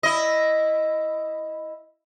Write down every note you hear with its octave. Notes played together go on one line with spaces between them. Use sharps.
E4 D#5